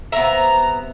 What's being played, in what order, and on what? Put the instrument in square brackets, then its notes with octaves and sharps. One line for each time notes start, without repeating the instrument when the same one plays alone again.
[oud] C3 [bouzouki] B3 E5 [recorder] A#5